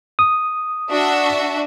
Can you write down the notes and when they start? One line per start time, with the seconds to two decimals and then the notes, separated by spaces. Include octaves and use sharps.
0.19 D#6
0.89 D4 F#4 E5